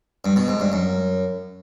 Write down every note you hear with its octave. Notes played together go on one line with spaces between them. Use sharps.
G2
B2
G#2
G2
F#2